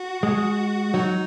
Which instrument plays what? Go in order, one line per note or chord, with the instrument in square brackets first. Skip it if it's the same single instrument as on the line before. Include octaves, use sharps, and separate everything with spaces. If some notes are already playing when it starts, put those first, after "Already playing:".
Already playing: [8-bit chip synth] F#4
[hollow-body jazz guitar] G#3
[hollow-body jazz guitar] F#3 [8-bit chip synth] D#4